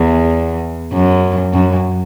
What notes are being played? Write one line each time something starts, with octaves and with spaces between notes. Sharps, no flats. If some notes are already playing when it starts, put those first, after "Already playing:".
Already playing: E2
F#2
F#2